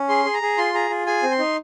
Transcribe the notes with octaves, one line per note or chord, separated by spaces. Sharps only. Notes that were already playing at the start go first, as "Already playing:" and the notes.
Already playing: C#4
G#4 C6
G#4
A#5
G#4
F4 C6
G#4 A#5
F4
G#4 G#5
C4
C6
D#4